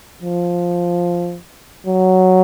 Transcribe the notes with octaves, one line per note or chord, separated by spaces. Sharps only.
F3
F#3